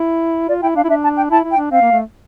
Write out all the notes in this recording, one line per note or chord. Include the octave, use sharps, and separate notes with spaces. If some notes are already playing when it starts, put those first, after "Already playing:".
Already playing: E4
F4 D5
E4 G5
D4 F5
E4
D4 E5
A5
G5
E4 A5
E4
G5
D4
C4 F5
A#3
A3